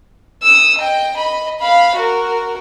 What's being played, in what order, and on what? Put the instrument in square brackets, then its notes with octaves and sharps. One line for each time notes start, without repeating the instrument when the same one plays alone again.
[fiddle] D#6 E6
D#5 G5
D#5 B5
F5 B5
F#4 A#4